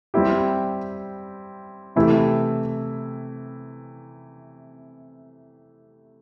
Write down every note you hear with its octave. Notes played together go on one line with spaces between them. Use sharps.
G3 C4 E4 G4
C3 E3 A3 E4 G4